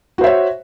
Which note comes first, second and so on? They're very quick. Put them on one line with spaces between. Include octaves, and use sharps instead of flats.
F#4 C5 E5 C#5